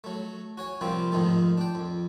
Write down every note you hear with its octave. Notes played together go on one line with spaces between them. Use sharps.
F#3 A3
F#4 C#5 G#5
C3 F3 G3 A#3 C4
F2 G#2 D#3 F3 A3
D4 G5
F2